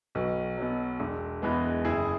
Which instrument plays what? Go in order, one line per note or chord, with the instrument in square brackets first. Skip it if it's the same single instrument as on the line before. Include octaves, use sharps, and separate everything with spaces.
[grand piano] B1 F#4 B4
B2 F#3
E1
E2 E3 G#3 B3
F#1 E4 G#4